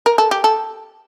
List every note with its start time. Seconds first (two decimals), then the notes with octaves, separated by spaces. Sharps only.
0.06 A#4
0.18 A4
0.31 G4
0.44 A4